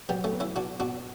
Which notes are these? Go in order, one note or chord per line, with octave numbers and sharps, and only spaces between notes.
F#3 G3 B3
A3 C#4
B3
C#4 E4
B3 D4 F#4
B2 D4 F#4